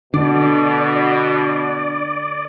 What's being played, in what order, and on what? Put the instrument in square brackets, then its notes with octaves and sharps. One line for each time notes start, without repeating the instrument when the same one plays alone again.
[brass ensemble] B2 [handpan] D3 [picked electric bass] D4 [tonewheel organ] D5